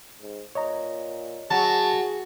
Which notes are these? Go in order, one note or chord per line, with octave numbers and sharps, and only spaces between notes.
G#2
A#2 C#5 D#5 A#5
F#3 G#4 A5